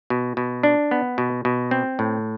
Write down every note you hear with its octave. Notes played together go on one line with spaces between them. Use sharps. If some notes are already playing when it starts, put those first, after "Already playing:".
B2
B2
D4
B3
B2
B2
C4
A2